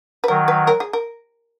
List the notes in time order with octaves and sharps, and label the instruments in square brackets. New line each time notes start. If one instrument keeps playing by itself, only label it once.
[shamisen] B4
[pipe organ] D#3 F#3 [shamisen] A#4
[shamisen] B4
A#4
G#4
A#4